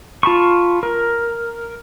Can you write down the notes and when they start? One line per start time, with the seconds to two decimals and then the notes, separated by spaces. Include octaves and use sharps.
0.23 F4 A5 B5 C#6
0.83 A#4